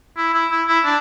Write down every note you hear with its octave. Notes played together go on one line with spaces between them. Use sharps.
E4
E4
E4
E4
D4